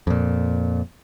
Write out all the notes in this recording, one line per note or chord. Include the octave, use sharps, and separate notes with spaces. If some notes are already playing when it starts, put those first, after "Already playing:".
F2 A#2